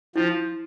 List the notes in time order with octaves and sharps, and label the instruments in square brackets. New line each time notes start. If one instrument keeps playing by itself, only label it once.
[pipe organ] F3 [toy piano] E4